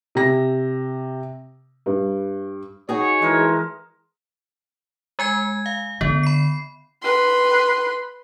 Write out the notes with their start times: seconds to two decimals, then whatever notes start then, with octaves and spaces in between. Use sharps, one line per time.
0.15 C3 A#6
1.86 G2
2.89 D#4 F#4 G#4 C#5
3.22 E3 G#3 A#4 A5
5.19 G#3 G#5 G#6
5.66 F5
6.01 D3 B3
6.23 B5 C7
7.03 B4 C6